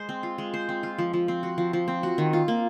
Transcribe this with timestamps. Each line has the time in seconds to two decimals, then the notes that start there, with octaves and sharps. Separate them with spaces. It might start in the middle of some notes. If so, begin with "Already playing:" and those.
Already playing: G#3 C5
0.09 C4
0.23 F4
0.38 G#3
0.54 C5
0.69 C4
0.83 F4
0.98 F3
1.13 F3
1.28 C4
1.43 F#4
1.58 F3
1.73 F3
1.88 C4
2.03 F#4
2.18 D#3
2.33 F4
2.48 A#3